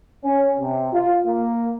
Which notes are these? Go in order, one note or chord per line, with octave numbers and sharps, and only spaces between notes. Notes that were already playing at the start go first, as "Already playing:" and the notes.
C#4
C3
F4
A#3